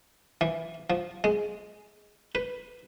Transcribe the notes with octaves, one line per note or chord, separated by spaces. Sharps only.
E3
F3
G#3
B4